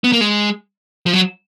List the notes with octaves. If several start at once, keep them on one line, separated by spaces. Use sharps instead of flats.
B3
A#3
G#3
F3
F#3